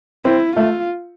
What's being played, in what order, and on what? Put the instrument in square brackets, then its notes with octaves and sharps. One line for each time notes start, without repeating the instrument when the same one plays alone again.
[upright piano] C4 [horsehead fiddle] E4
[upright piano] A3 [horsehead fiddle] F4